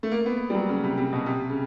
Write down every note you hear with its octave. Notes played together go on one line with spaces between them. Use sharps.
A3
A#3
B3
G3
F#3
C#3
C3
C3
B2
C3
C#3